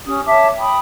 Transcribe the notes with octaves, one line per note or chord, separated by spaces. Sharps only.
C#4 G4 D#6
C#5 E5 A5 D6
G5 B5 D#6